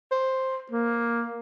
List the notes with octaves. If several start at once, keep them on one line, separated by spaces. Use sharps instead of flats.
C5
A#3